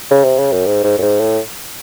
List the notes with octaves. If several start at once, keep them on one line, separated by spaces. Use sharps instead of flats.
C#3
C3
C#3
F#2
G#2
G#2
F#2
G#2
A2